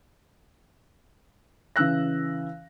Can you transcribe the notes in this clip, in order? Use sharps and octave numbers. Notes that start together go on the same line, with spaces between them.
C#3 E3 E6 F#6 A#6